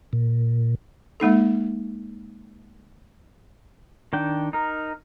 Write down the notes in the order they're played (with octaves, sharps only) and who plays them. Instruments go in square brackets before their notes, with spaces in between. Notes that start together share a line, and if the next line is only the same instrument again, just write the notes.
[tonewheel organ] A#2
[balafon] G#3 A#3 D#4 A4
[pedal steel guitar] D#3 D4 G5
D#4 A#4